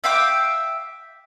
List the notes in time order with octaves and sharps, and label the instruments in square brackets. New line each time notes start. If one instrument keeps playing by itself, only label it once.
[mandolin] E5 F5 G5 D6